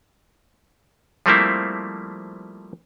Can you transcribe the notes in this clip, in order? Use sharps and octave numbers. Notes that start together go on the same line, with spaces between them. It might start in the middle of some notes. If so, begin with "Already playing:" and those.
F3 G3 A3 A#3 C4 E4